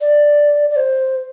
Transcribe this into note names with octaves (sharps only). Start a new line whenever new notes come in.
D5
D5
C5